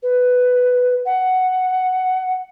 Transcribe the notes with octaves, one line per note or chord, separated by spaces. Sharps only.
B4
F#5